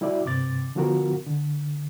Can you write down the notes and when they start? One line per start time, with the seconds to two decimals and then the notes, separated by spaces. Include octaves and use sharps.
0.01 G3 E4 F#4 D5 E5
0.25 G2 C3 D6 A6
0.75 D3 F3 B3 F4 F#4 A#4
1.26 D3